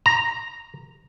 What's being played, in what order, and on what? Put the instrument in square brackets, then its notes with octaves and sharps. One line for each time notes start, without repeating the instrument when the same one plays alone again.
[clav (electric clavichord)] A#5